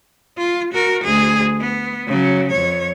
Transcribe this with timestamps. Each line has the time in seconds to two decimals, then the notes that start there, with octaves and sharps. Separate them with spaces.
0.38 F4
0.73 F#4 A#4
1.04 D2 G#4
1.60 B3
2.07 C#3 F#3
2.51 F2 C#5